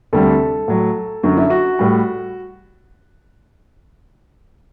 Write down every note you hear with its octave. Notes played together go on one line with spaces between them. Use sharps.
D2 C3 G3 A4
A2 F#3
F#2 D3 F#3 F#4
E4
F#4
A2 G3